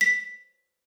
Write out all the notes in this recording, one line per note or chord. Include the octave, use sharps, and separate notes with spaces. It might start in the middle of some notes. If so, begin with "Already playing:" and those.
B6